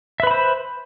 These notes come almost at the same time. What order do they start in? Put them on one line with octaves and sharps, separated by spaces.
E5 B4 B5 C5